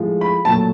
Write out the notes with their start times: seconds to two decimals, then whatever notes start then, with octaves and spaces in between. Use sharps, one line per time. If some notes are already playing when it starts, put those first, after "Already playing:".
Already playing: A2 F3 G#3
0.21 B5
0.45 A#2 F#3 A3 A5